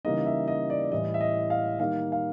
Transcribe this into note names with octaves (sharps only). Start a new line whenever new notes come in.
C#3 E3 G3 A#3 D#4 D#5
E5
D#5
D5
D5
A2 E3 G3 D#5
E5
D#5
F5
D#3 G3 A#3 D#4 F5
F5